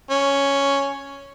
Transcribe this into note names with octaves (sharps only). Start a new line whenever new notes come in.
C#4